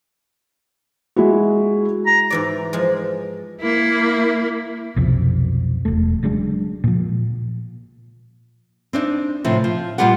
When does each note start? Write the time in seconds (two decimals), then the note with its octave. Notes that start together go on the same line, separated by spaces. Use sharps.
1.16 G#3 E4 F#4
2.06 A#5
2.30 G#2 E3 D5
2.73 F3 G#3
3.62 A#3 E4
4.96 B1 F2 C3
5.85 E1 A3
6.23 C#3 F#3 G#3 D4
6.84 A#2 F3
8.93 C4 D4 D#4
9.45 A2 C3 F3
9.64 F3
9.98 A#2 G3 F4 G4 F#5